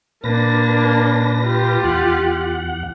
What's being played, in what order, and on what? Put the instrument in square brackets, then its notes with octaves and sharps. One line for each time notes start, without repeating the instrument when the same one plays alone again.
[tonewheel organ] A#2 B4 A#6 [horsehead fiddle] A#3 D4
[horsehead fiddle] F4 G4
[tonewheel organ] E2 F#5